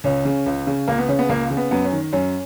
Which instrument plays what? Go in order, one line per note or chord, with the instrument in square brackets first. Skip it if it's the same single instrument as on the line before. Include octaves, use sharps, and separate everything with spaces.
[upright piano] C#2 C#4
C#3
C#2
C#3
C#2 A#3
B3
C#3 C#4
B3
C#2 A#3
C#3
B3
F#2 B3
C#4
D#3
F#2 C#4